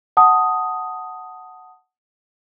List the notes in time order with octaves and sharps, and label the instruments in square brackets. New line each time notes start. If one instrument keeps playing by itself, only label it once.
[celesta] F#5 A5 D#6